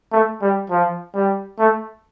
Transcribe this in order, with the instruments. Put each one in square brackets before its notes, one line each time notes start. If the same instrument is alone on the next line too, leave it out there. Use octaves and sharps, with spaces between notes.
[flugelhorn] A3
G3
F3
G3
A3